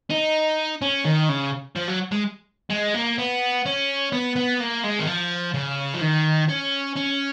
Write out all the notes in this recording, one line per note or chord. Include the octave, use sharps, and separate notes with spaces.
D#4
C#4
D#3
C#3
F3
F#3
G#3
G#3
A#3
B3
C#4
B3
B3
A#3
G#3
D#3
F3
C#3
F3
D#3
C#4
C#4